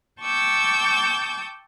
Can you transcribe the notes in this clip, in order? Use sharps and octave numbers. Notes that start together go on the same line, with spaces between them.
G5 A5 C#6 D6 E6 G6